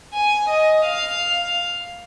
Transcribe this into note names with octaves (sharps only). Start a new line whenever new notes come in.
G#5
D#5
F5